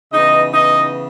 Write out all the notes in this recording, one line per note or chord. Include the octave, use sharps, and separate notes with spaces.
C#3 E3 B3 D#4 D#5
D#4 D#5